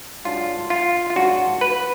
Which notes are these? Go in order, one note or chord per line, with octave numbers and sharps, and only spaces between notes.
G#2 F#3 D4 F4
F4
F4
G#2 F#3 D4 F#4
B4